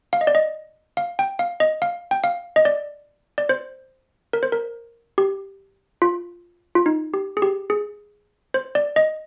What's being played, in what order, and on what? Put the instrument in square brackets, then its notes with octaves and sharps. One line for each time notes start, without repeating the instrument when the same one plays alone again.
[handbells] F5
D#5
D5
D#5
F5
G5
F5
D#5
F5
G5
F5
D#5
D5
D5
C5
A#4
C5
A#4
G4
F4
F4
D#4
G4
G#4
G4
G#4
C5
D5
D#5